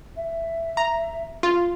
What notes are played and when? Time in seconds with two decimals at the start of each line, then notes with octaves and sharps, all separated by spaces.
0.17 E5
0.77 A#5
1.43 F4